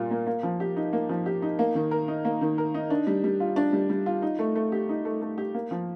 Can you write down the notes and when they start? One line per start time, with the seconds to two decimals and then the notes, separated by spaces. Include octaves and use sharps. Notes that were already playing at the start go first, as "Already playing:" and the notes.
Already playing: A#2 G3 F4
0.11 A#3
0.27 A#3
0.43 F3
0.60 G4
0.76 D#4
0.93 A#3
1.09 F3
1.26 G4
1.42 D#4
1.59 A#3
1.75 D#3
1.91 A#4
2.08 D#4
2.25 A#3
2.41 D#3
2.58 A#4
2.74 D#4
2.90 D4
3.07 G3
3.24 G3
3.40 F4
3.56 D4
3.73 G3
3.90 G3
4.06 F4
4.22 D#4
4.39 A3
4.56 A3
4.72 G4
4.89 D#4
5.05 A3
5.22 A3
5.38 G4
5.54 A#3
5.71 F3